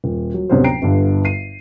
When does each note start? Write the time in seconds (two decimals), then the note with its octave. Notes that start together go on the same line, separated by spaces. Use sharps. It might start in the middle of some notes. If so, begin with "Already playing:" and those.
0.04 D#1
0.34 F#3
0.49 D1 C3 B3 C#4 D4 C5
0.64 G5 A#5 C7 D7
0.82 G1 G2 D3
1.25 C7 D#7